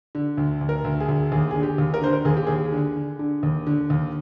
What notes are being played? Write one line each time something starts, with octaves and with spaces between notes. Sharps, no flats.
D3
D2
D2
A#4
D2
G#4
D2
D#2 G#4
D3 G#4
G4
D#2
A#4
D3 C5
A#4
D#2 G#4
G4
D#2 G#4
D3
D3
D3
D#2
D3
D#2